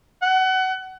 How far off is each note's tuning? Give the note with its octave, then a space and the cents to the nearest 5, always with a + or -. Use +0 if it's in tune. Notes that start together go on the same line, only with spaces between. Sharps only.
F#5 +25